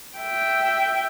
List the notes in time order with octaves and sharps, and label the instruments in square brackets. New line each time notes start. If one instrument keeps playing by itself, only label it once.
[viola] E5 G5